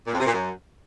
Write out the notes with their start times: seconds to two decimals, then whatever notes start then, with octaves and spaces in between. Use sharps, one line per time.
0.07 A#2
0.14 F2
0.20 C3
0.27 A#2
0.33 F#2